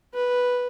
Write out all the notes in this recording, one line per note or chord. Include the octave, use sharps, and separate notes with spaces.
B4